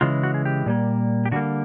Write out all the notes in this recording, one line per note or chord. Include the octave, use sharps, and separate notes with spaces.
C#3 E3 G#3 F4
F#4
G#4
G4
A#2 G3 A#3
G4
D3 G3 A#3 F#4